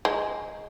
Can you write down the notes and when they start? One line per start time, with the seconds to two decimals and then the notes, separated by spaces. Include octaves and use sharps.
0.05 G#3